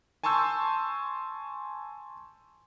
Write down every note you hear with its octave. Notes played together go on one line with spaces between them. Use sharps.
G#5 A5 C6 C#6 E6 G6